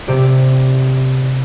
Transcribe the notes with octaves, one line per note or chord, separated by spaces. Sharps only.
C3 G4 D5